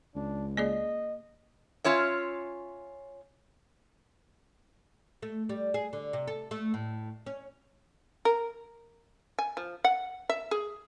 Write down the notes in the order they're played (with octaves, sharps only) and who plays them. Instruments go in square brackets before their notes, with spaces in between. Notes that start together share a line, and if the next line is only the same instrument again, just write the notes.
[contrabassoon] C#2 [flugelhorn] D4
[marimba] A#3 G#4 D5 [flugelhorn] D#5
[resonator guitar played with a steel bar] C#4 F4 C#5 E5
[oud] A3
G3
G#4
D3
C3
A4
A3
A2
C#4
[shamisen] A#4
G#5
F3
F#5
E5
G#4